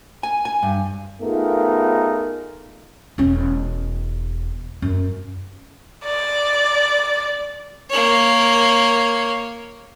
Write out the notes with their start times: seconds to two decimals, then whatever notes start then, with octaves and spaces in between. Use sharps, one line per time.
0.23 G#5
0.45 G#5
0.63 G2
1.21 A3 B3 D#4 F4 G#4 A#4
3.18 E1 C#4
4.82 F#2
6.05 D5
7.90 A#3 C#5